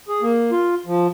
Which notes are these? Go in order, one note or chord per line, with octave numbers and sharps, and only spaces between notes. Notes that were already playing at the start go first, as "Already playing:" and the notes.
G#4
A#3
F4
F3